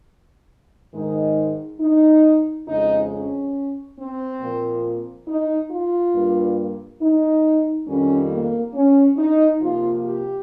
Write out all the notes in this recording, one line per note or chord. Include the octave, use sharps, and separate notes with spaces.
G#2 D#3 G#3 D#4
D#4
F2 C#3 G#3 D#4
C#4
C4
A#2 F3 A#3
D#4
F4
G2 G3 A#3
D#4
F2 D#3 G3 C#4
A#3
C#4
D#4
C3 F3 A#3 F4
G4